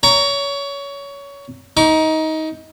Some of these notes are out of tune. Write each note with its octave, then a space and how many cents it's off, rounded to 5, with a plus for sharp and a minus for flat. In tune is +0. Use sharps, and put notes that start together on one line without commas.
C#5 +20 A#5 +0
D#4 +20 D6 -45